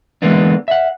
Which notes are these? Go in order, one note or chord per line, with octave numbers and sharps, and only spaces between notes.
D3 E3 G#3 A#3 B3 D4
E5 F#5